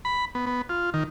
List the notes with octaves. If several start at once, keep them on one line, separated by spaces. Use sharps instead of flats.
B5
B3
B3
F4
D#3